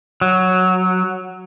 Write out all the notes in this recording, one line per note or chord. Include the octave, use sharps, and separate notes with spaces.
F#3